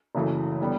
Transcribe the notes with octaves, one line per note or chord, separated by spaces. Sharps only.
F#1 F#2 C#3 E3 A3
D3 G3 B3